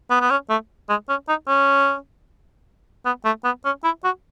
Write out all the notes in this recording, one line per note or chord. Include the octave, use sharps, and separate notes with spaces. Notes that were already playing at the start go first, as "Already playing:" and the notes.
B3
B3
C#4
A3
G#3
C#4
D#4
C#4
B3
A3
B3
C#4
E4
F#4